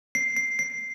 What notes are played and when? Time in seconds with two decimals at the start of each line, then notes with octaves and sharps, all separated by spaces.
0.15 C7
0.37 C7
0.59 C7